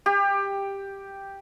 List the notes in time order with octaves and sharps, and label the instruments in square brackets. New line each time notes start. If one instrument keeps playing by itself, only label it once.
[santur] G4